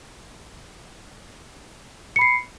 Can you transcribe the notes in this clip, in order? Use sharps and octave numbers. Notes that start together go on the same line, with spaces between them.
B5 C7 C#7